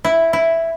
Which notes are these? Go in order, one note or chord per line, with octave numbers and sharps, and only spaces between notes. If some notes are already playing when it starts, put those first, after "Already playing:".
E4
E4